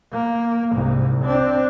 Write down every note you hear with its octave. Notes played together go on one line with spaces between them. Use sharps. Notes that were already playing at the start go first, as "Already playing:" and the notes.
A#3
C2 G#2
C4 D4